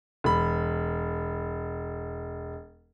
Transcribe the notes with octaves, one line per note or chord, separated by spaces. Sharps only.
E1 B5